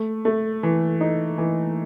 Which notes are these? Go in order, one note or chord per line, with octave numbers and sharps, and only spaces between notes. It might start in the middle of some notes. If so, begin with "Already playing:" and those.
Already playing: A3
A3
E3
D#4
E3